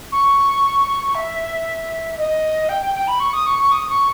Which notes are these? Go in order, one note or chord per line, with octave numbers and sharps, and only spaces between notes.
C#6
E5
D#5
G5
G5
G5
B5
C#6
D#6
C#6
C#6
D#6
C#6